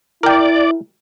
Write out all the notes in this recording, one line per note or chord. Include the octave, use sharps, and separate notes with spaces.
E4 A#4 D5 G5